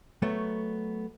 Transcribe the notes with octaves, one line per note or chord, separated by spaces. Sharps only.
F#3 A3 B3 C#5